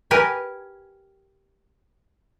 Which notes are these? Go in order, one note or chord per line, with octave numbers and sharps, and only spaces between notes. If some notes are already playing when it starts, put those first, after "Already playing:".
G4 A#4 B4 G#5